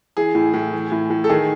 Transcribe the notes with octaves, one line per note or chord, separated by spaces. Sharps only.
E3 G#4
A2
A2
E3
A2
A2
A4
D#3 G#4